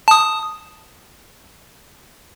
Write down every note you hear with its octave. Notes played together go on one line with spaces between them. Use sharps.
A5 D#6